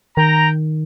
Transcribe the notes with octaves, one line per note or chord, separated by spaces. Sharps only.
D#3 G5 A#5